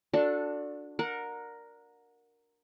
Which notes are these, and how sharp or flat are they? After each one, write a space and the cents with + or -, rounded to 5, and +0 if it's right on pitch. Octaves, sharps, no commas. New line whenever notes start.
D4 +0 F#4 -30 A4 +10
A#4 +0 F#5 -25